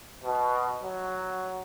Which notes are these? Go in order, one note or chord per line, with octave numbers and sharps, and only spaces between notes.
B2
F#3